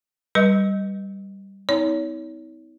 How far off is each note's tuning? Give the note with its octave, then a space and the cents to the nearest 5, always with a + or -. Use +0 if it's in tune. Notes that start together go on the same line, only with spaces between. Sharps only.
G3 -5 B4 -25 D#5 +0
B3 +40 D#4 +45 C#5 +30